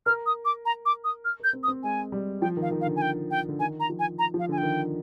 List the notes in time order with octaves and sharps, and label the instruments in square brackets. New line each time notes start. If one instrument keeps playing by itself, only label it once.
[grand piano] A#4 [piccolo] F6
[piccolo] D#6
D6
A#5
D6
D#6
F6
[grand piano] A#4 [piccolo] G6
[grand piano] C4
[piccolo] D#6
[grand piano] C4
[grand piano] G#3 [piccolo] G#5
[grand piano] G3
[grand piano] F3 [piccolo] G5
[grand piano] D#3
[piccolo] F5
[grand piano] D#3
[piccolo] F5
[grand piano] D3
[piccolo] G#5
G5
G5
[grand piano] D3
[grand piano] D#3 [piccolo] G#5
[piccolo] A#5
[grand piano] F3
[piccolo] G#5
A#5
[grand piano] F3
[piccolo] F5
[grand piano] D3 [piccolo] G#5
[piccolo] G5
[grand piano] D#3